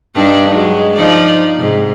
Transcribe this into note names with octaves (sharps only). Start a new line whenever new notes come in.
G2 D4 D#4
F#3 G#3
F3 D#4 D5
G#2 C3